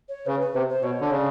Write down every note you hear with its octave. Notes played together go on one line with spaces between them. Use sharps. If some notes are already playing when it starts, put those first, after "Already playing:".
C#5
C#3 B4
B4
C3 C5
C5
B2 C#5
D3
C#3 D5